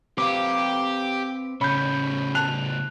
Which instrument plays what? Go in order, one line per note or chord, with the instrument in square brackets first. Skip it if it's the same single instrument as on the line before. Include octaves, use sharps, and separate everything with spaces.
[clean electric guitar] C4 B4 F5 [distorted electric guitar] G4 [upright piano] D6
[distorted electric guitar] A2 C#3 [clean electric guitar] C#4 [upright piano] B5 G6
[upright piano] A5 F#6 F7